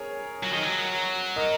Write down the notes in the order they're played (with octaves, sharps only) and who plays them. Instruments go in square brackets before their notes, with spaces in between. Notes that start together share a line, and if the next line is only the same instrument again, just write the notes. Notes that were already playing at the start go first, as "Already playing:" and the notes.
Already playing: [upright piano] G#4 A#4 C#5
[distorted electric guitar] F#3
D#3
F#3
[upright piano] A#4 D#5